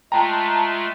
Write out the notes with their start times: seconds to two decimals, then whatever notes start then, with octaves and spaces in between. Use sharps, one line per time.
0.12 G#3 A3 F4 G5 A5 A#5